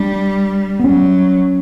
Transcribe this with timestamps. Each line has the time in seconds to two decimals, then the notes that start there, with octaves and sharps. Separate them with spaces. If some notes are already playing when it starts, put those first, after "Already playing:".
Already playing: G3 D4
0.80 B3
0.84 F#3 C#4